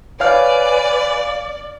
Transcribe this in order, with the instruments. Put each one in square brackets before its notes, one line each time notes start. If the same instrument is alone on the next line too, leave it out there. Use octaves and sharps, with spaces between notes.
[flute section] B4 G#5 [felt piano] C#5 F5 F6 [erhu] D5